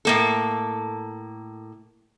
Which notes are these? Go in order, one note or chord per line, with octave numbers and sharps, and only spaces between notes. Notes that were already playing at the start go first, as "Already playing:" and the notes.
A2 A#3 A4